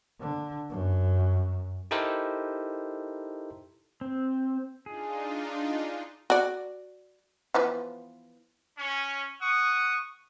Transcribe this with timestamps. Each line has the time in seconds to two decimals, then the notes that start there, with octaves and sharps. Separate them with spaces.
0.20 D3
0.70 F#2
1.91 D#4 E4 G4 A4 A#4 C5
4.01 C4
4.86 D4 D#4 F4 G#4
6.30 F#4 D5
7.54 E3 F3 B3
8.79 C#4
9.40 F#5 C#6 D#6